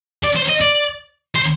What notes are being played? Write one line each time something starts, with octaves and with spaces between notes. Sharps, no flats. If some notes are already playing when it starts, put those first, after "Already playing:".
D5
C5
D#5
D5
C5